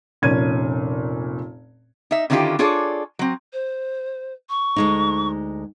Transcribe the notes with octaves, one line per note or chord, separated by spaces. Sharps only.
F1 A#2 C#4 G#6 D#7
D#4 E5
D3 D#3 C#4 E4 F4 G4
D4 F4 G#4 A4 C#5 D5
F#3 C4
C5
C#6
D2 G#3 D#4